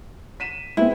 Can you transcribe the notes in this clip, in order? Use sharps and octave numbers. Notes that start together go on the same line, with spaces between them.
B6 D#7 E7
G#3 B3 C4 E4